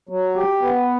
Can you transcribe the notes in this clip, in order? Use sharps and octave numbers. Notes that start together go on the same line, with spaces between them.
F#3
G4
B3